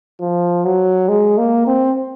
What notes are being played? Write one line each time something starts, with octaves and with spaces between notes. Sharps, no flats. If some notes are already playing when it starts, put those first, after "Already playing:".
F3
F#3
G#3
A#3
C4